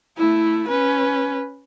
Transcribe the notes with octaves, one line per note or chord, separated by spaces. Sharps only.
A3 E4
C#4 B4